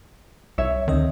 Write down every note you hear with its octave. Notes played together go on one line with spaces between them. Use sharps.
C2 C#5 E5
D2 D#3 C4 D#5